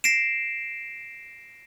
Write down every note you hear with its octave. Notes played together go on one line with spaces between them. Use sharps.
A#6 C7 D7 E7